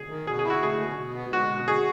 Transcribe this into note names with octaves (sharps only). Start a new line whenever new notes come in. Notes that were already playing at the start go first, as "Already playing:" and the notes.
Already playing: G#4
D#3
B2 G#4
G#4
E4
F#4
A3 G#4
B2
B2
B3
G#3 F#4
B2
F#4 G#4